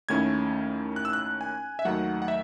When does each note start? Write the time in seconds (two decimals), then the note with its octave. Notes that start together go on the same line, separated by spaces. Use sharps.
0.09 D#2 D#3 A3 C#4 E4 G#6
0.96 F#6
1.05 E6
1.13 F#6
1.41 G#5
1.79 E5
1.85 D#2 D#3 F#3 A3 D#4 F#5
2.22 F#5
2.28 E5